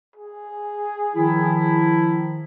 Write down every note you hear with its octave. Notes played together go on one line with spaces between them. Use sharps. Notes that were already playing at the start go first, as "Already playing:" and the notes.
G#4
D#3 F3 E4